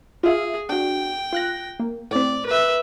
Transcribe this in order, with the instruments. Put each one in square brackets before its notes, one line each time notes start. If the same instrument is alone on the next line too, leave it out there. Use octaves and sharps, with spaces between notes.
[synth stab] F4 E5 F5 [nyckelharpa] G#4
[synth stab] D4 F#4 [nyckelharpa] G5
[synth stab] F4 F#6 A#6
A#3
[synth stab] A2 C4 [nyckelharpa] D5
[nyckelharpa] B4 E5